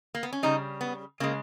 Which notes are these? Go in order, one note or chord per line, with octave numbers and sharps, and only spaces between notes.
A#3
B3
C#4
C#3 G3 D#4
B3
C#3 G#3 A#3